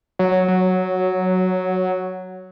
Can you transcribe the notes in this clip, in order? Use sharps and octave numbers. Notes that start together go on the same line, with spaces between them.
F#3
F#3